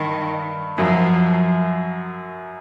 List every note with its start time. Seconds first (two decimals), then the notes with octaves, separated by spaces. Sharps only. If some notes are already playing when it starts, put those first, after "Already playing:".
Already playing: G2 D#3
0.78 F#2 F3 F#3